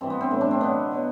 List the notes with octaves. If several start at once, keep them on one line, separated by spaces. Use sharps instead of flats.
G2 E3 C4
B3
C4
A2 F#3
D4
C4
B2 F#3 B3
B2 F#3